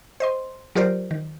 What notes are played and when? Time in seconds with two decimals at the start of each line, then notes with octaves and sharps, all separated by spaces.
0.20 C5 D#5 C6
0.75 F#3 F4 G4 A#4 C5 D5
1.11 D#3